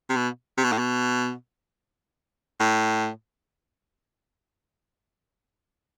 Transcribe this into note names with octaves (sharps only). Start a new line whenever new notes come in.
C3
B2
C3
B2
A2
B2
A2